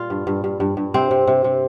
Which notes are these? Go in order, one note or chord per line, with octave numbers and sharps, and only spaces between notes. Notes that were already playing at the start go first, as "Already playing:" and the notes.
Already playing: A#2 G3 F4
G2
G2
G2
G2
G2
C3 C4
C3
C3
C3